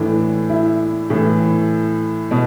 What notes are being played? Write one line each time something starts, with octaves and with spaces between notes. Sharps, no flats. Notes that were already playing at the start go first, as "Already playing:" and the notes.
Already playing: A2 E3 D4
E4
A2 E3
B2